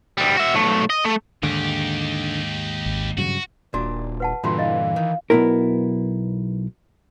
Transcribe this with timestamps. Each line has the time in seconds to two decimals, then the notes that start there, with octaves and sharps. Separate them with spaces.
0.18 D2 G3
0.37 F#4 E5
0.55 B1 A3
0.90 D#5
1.05 A3
1.43 D#2 G#2 D3 D#4 G4
2.86 G#1
3.18 G2 C#3 F#3 F#4
3.74 D#1 A#2 D4 F#4
4.20 B4 F#5 A5
4.44 G2 A#2 D3 E3 F4 F#4 C6
4.59 D#5 F5
4.96 D#3
5.30 B1 F#2 B3 E4 A#4